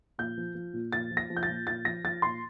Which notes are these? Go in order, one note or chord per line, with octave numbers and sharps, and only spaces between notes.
A#2 G6
F3
F3
A#2
A#2 A6
F3
A#6
F3
G6
A6
A#2
A#2 A6
F3 A#6
F3 A6
A#2 C6